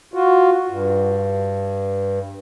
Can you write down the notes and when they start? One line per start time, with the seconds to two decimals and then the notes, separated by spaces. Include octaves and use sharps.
0.14 F4 F#4
0.70 G2